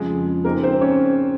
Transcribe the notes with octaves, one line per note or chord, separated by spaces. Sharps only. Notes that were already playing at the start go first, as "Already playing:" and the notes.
Already playing: F2 C#3 F3 G#3 G#4
C#3 G#3 A#3 C4 D#4 A#4
C4 C5
C#4 C#5